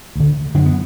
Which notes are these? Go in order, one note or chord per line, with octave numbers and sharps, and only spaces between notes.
D2 D3
F#2 D3 D4
B3